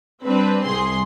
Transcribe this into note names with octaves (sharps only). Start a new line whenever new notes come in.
G3 C4 D4 B4
C2 G#4 C6